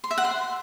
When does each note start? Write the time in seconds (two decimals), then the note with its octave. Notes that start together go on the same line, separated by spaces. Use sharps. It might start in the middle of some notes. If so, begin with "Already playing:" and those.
0.04 C6
0.11 E5
0.18 F#5
0.25 C6